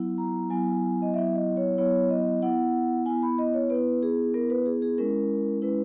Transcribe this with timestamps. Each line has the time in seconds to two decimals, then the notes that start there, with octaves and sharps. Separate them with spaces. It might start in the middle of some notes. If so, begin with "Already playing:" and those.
Already playing: F#3 B3 E4
0.18 A#5
0.50 F#3 B3 E4 G#5
1.02 D#5
1.14 F#3 B3 E4 E5
1.35 D#5
1.57 C#5
1.78 F#3 B3 E4 C#5
2.10 D#5
2.42 B3 E4 F#5
3.06 B3 E4 G#5
3.23 B5
3.39 D#5
3.54 C#5
3.70 B3 E4 B4
4.03 G#4
4.34 B3 E4 A#4
4.50 B4
4.66 G#4
4.82 G#4
4.98 G#3 C#4 E4 A#4
5.62 G#3 C#4 E4 B4